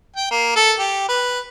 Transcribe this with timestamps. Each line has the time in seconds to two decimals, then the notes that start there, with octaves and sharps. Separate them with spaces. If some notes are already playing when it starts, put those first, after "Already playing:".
0.16 G5
0.31 A#3
0.56 A4
0.78 G4
1.08 B4